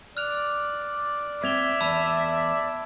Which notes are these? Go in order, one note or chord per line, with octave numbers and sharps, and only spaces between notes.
D5 F6 F#6 F7
C4 E5 G#6 F7 G7
E2 A5 B5 E6